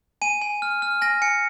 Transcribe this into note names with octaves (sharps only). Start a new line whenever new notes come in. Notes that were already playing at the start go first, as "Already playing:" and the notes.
G#5 D#7
G#5
F6
F6
G#5 A#6
G#5 C#7